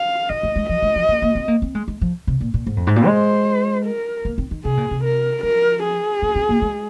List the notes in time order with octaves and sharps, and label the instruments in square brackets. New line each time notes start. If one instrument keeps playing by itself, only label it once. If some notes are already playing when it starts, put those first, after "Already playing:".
Already playing: [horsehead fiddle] F5
[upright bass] D#3 [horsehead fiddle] D#5
[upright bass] G#3
G#3
[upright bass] F3 [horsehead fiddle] D#5
[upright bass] G#3
F3
A#3
A#3
C4
A#3
C4
G#3
G#3
F3
C3
A#2
A#2
G#2
F2
G#2
A#2
[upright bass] G#3 [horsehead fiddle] C5
[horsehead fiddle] A#4
[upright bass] A#3
C4
D#3
[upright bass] C3 [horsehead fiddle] G#4
[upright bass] A#2
C3
[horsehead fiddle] A#4
[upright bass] F3 [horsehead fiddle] A#4
[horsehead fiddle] G#4
[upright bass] A#3
C4
A#3
G#3